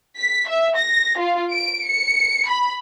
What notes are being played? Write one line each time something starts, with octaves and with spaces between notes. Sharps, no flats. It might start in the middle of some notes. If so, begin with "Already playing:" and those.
B6
E5
A#6
F4
D7
C#7
B5